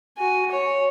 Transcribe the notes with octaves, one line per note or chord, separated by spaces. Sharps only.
F#4 G#5
C#5